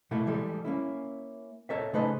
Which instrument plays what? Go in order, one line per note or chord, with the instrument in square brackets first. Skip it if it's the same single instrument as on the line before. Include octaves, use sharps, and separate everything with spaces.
[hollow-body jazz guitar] B2 A3 A#3 E4 A4
E3 G3 G#3 A4
A#3 C#4 E4
A4 A#4 C#5 D#5 E5
C#3 A3 D#4 B4 C5 D#5